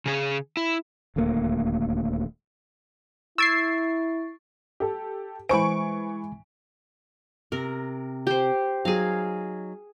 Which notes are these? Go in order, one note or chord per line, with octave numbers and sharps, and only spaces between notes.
C#3 G#4
E4
D#1 D2 A3 A#3
E4 C#6 E6 G#6 A6 C7 D7
G4 A4
E3 G#3 C5 G#5 B5 C#6 D7
C3 A#4
G4 C5
F#3 D#4 G#4 F5